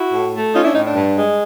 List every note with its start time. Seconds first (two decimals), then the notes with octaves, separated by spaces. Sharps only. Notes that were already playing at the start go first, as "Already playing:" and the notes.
Already playing: E4 F#4
0.13 A2
0.33 A3
0.54 C#4 D#4 F4
0.64 D4 E4
0.74 A2 D#4
0.85 D4
0.95 G2
1.16 G#3